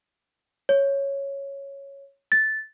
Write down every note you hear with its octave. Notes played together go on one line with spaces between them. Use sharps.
C#5
A6